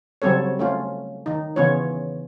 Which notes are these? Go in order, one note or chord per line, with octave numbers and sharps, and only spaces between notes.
C#3 F#3 G3 C4 A4 C#5
A3 C#4 F4
D#3 D#4
C#3 E3 B3 C#4 F4 C#5